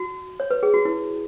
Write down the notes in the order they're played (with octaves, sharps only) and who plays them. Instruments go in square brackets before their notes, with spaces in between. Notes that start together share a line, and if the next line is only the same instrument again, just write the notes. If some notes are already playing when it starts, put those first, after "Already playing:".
Already playing: [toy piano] F#4
C#5
B4
G#4
F#4
E4